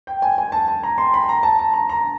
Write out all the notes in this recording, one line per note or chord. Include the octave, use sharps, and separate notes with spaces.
G5
G#5
G#5
A5
A5
A#5
C6
B5
A#5
A5
A5
A#5
A#5